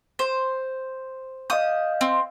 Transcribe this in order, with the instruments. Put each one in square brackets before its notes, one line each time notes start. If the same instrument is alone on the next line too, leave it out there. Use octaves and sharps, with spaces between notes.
[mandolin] C5
[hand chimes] D#5 F5 G6 [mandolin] D#6
[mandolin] C4